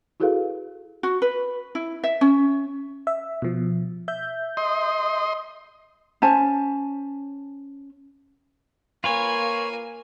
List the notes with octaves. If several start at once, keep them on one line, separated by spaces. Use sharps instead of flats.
E4 F#4 G#4 A4 B4 F5
F#4
B4
E4
E5
C#4
E5
B2 F3
E5 G6
D#5 C6
C#4 C5 G#5 A5
A#3 F4 B4 C#5 G#5